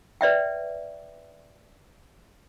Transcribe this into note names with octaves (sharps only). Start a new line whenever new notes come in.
B4 D5 E5 G5